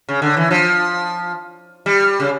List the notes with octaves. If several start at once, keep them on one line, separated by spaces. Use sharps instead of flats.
C#3
D3
E3
F3
G3
C#3